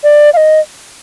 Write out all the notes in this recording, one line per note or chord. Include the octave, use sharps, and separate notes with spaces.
D5
F5
D#5